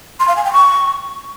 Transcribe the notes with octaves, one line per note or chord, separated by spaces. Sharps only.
C6
F5
G#5
G5
C#6